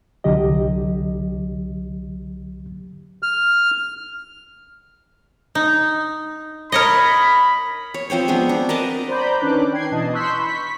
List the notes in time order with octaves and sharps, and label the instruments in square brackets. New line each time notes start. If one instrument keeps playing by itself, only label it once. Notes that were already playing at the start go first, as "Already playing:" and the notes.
[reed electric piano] C2 D3 F#3 G4 D#5
[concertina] F6
[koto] D#4
[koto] A#4 C#5 D#5 [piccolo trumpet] B5
[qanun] C#5
F3 C4 C5 C#5
G#3 B3 C4 D4
D4
A#4 B4 D#5 A5
[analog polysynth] C5 D5 A#5 B5 G6
D#3 C#4 D4 B4 D6 F#6
G5 G#6 C7
B2 E3 D#5 A5
C6 C#6 E6 F#6 G6 B6
B5 C#6 B6